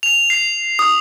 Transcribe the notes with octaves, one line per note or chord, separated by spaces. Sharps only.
F7
C7
D#6